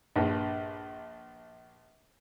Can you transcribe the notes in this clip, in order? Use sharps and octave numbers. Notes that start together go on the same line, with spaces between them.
A#1 G2